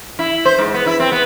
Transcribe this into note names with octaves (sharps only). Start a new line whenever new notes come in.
E4
C5
G#2
B3
E4
C4
B3